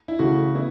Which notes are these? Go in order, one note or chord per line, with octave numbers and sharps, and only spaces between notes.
E4
C#3 E3 A3 F#4
B3 E4